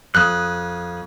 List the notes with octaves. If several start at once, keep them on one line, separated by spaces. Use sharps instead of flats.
F2 D#6 F#6